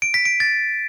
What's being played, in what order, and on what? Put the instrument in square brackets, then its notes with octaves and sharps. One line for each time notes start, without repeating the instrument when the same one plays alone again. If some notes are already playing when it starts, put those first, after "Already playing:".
[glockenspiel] D7
B6
D7
A6